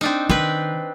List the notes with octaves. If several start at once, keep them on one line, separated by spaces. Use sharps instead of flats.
C4 D4 D#4
D#3 C4 B4